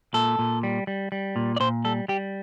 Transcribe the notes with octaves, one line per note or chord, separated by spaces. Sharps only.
A#2 A4
A#2
G3
G3
G3
A#2
D5
A#2 C5
G3 A4
G3 G4